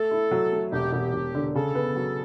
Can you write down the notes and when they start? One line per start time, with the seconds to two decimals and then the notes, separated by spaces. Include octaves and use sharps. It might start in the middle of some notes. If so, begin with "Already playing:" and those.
Already playing: A3 A4
0.11 E4
0.31 F#3
0.52 A3
0.72 E1 G4
0.92 E1 G4
1.14 E1
1.35 D3
1.55 C#3 A4
1.75 B3
1.96 F#3